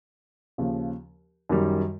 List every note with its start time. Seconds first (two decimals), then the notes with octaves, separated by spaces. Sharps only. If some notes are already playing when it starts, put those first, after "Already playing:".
0.58 D#2 C#3 F3
1.49 F#2 D#3 G3